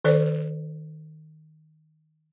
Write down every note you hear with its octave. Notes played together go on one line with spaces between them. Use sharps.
D#3 A4 C5 D5